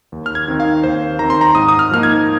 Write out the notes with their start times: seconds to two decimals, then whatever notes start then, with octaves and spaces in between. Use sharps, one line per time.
0.12 D#2
0.26 F6
0.35 G#6
0.48 D#3 C4 D#4
0.60 F5
0.84 D#2 C5
1.19 D#3 C4 A#5
1.30 C6
1.41 A#5
1.55 G#2 D#6
1.69 D#6
1.79 F6
1.91 F3 A#3 D#4 F6
2.03 G#6